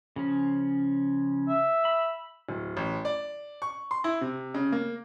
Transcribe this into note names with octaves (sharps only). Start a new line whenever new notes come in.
C#3 F3 C#4
E5
B5
D1
A1
D5
C#6
C6
E4
C3
C#3
A#3